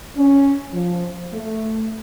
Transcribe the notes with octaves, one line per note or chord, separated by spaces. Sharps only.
C#4
F3
A3